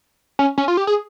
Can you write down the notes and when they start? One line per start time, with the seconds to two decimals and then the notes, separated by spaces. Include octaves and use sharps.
0.39 C#4
0.58 C#4
0.68 F4
0.77 G4
0.87 G#4